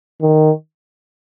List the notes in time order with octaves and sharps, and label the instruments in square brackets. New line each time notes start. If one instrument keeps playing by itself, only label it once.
[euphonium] D#3